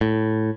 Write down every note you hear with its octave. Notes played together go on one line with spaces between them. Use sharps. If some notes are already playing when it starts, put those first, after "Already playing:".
A2